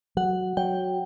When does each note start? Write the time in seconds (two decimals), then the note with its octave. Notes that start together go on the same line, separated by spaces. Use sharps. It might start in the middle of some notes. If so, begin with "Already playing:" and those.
0.17 F#3 F#5
0.57 F#3 G5